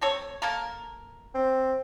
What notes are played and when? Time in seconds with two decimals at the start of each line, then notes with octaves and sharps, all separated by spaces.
0.01 C4 A4 C#5
0.42 A#3 A4 A#4
1.35 C4